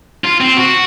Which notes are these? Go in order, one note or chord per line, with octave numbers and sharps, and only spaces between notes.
F4
C4
F#4